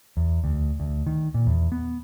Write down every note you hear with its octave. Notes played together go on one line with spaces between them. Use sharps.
E2
D2
D2
D#3
A#2
E2
B3